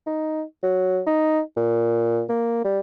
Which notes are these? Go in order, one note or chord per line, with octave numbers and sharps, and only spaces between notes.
D#4
F#3
D#4
A#2
A#3
G3